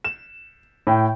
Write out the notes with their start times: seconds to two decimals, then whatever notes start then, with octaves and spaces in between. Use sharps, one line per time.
0.04 E7
0.87 A2 G5